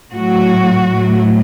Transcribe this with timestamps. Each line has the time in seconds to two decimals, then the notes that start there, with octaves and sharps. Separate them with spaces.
0.12 A2 F#3 F#4
0.90 A2 F#3